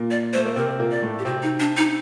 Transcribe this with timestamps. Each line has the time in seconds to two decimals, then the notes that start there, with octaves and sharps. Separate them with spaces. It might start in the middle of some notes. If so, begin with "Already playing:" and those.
Already playing: A#2 A#3
0.11 D5
0.33 A3 C5
0.45 A#3
0.56 C3 C4 A#4
0.79 A#2 A#3
0.91 D5
1.02 A2 A3
1.19 G4
1.25 C3 C4 F#4
1.43 D#4
1.60 D4
1.77 D#4